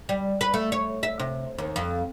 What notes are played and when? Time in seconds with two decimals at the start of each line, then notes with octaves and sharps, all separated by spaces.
0.09 G3
0.41 B4
0.54 A3
0.72 C#5
1.03 E5
1.19 C3
1.58 D#2
1.76 F2